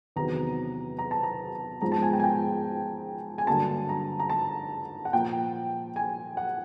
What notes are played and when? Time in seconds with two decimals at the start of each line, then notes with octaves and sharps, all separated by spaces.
0.16 E2 C3 D#3 F#3 A#5
0.99 A#5
1.11 A5
1.23 A#5
1.82 G#2 F3 G#3 B3 A#5
1.92 A5
2.03 G#5
2.13 G5
2.19 G#5
2.24 G5
3.38 G#5
3.47 G2 D3 F#3 A#3 A5
3.89 A#5
4.20 A#5
4.30 A5
5.05 F#5
5.13 A#2 F3 A#3 G5
5.96 G#5
6.37 F#5